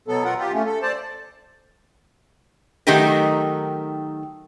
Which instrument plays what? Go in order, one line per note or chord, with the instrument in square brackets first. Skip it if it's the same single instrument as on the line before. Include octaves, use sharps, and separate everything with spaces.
[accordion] B2 F#3 B3 A4
B2 F4 A#4 F#5
F4 G4
A3 C#4
A4
C5 D5 A5
[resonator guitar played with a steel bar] D#3 F#3 A3 D#4 G4 A#4